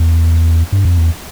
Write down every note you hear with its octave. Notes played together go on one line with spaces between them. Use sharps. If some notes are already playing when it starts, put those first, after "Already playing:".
Already playing: E2
G2
F2
E2